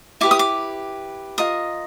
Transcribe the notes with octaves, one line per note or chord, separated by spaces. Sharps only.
E4 G4 B4 D6
D#6
D6
F4 A#4 D#5 D#6